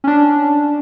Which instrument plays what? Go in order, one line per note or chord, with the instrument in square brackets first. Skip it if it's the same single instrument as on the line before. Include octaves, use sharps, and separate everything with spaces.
[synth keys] C#4 D4